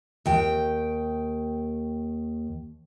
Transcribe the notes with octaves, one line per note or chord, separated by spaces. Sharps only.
D#2 G5